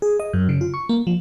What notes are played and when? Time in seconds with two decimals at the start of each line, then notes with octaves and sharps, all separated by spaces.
0.02 G#4
0.20 D#5
0.33 F#2
0.49 C#3
0.61 F4
0.74 C#6
0.89 A#3
1.07 F3